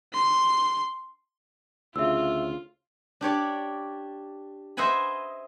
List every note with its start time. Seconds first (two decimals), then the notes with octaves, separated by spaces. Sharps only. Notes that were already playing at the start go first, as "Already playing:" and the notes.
0.13 C6
1.96 D2 C#3 F4 E5 E6
3.21 D4 G4 C#5 D5
4.77 C5 D#5 E5 F#5 G#5 B5